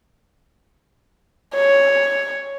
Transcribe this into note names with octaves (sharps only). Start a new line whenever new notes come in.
C#5